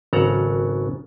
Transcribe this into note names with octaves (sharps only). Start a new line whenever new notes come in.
G#1 C#3 F#3 A4 F#5 A#5